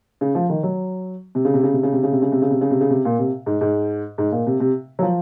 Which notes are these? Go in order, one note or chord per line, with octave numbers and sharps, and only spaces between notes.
C#3
F3
D#3
F#3
C3
C#3
C3
C#3
C3
C#3
C3
C#3
C3
C#3
C3
C#3
C3
C#3
C3
C#3
C3
A#2
C3
G#2
G#2
G#2
A#2
C3
C3
F#3
F3